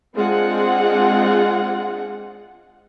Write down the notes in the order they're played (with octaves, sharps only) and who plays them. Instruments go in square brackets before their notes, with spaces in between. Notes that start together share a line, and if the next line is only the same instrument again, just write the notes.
[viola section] G#3 C4 D4 F4 G#4 F#5